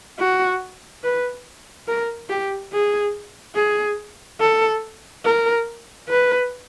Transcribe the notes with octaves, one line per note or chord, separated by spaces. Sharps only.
F#4
B4
A#4
G4
G#4
G#4
A4
A#4
B4